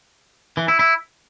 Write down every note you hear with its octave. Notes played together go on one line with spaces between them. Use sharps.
E3
E4
E4